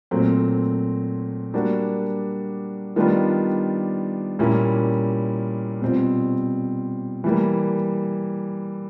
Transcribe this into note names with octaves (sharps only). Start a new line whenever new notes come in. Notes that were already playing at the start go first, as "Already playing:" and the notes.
A#2 F#3 A3 C4
G3 A#3 D4 F#4
D#3 G3 B3 D4 F4
A#2 G3 A#3 C#4 E4
B2 G3 C4 F4
E3 G3 A#3